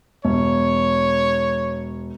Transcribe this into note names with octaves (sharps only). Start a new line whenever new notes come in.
E1 C#5